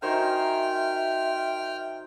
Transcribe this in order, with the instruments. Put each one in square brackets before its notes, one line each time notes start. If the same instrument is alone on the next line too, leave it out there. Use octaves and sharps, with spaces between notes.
[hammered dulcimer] D#3 C5 [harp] F#4 A#4 G#5 [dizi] E5 [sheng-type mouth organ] G5 F6